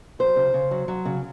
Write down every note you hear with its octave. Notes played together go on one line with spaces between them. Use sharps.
F#3 C5
C#3
C#3
F#3
F#3
C#3